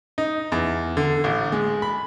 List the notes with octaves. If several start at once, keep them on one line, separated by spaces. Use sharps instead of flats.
D#4
E2
D3
A1
G#3
B5